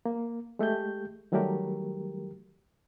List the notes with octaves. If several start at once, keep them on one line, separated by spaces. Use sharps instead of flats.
A#3
G#3 A3 G4 G6
D#3 F#3 G3 A3 G4 A#4